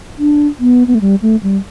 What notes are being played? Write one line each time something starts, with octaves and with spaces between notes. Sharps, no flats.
D4
B3
B3
A3
G3
A3
G3